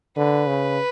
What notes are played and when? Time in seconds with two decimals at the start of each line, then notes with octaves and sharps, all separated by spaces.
0.17 D3 B4
0.47 C#3